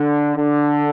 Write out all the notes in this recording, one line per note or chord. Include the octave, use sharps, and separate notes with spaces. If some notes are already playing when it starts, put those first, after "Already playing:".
Already playing: D3
D3